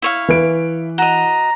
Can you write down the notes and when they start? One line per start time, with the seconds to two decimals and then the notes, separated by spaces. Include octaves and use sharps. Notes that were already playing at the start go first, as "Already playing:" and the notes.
0.02 E4 C#5 F5
0.28 E3 B4 D7
0.98 F#4 D#5 A#5